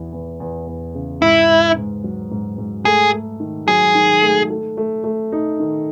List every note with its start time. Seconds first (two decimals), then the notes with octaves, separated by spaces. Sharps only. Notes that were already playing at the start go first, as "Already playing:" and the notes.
Already playing: E2 E3
0.12 E2
0.40 E2
0.67 E2
0.94 C#3
1.22 G#2 E4
1.49 G#2
1.76 G#2
2.04 F#3
2.31 G#2
2.58 G#2
2.85 A3 G#4
3.12 A3
3.40 D#3
3.68 F#3 G#4
3.95 D#3
4.22 A3
4.50 A3
4.77 A3
5.04 A3
5.32 D#4
5.60 D#3